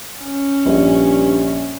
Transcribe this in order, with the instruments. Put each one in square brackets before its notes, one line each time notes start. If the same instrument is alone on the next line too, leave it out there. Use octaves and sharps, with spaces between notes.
[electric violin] C#4
[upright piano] A#1 [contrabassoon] G2